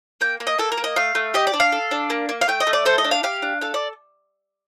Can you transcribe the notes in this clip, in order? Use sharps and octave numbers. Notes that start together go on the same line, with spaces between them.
A#3 G5
A#3
D#5
A#3 A4
A#4
A#3
D#5
A3 F5
A3
G4 D#5
D5
D4
F5
A4
D4
A#3
A#3
F5
A3 G5
D#5
A3
D5
A4 C5
D#5
D4
F5
G4 F5
D4
A4 F5
D5